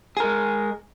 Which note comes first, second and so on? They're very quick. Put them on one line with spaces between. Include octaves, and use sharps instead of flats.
G#4 A#4 G#3